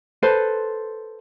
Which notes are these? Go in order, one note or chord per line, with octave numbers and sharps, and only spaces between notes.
A4 B4 C5